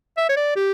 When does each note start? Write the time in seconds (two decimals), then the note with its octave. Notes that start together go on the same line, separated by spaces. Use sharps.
0.17 E5
0.29 C#5
0.37 D5
0.56 G4